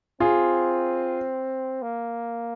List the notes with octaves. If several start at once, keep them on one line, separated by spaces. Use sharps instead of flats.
C4 F4 G#4
A#3